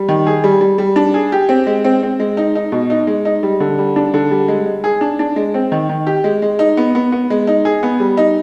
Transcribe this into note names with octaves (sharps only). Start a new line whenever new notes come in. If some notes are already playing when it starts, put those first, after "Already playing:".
Already playing: G3
D#3
G#4
G3
G3
G3
D4
G#4
G4
C4
G#3
C4
C4
G#3
D#4
D#4
B2
D#4
G#3
D#4
G3
D3
G3
D4
D3
G3
G#3
G#3
G#4
D4
D4
G#3
C4
D#3
D#3
G4
G#3
G#3
D#4
B3
B3
B3
G#3
D#4
G#4
B3
G3
D#4